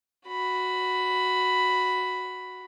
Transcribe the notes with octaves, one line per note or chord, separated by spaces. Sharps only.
F#4 B5